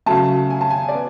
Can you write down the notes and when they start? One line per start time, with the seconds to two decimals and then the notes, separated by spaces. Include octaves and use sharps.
0.06 C#3 F#3 A3 A5
0.50 G#5
0.61 A5
0.70 G#5
0.89 D5
0.94 B3